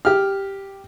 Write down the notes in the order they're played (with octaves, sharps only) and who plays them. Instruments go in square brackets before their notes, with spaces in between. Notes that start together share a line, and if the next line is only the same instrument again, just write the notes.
[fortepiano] G4 F6